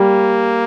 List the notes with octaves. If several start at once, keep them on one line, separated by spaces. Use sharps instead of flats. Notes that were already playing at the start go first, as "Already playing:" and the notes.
Already playing: G3 A#3